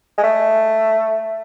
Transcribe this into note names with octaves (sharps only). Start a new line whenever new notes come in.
G#3
A3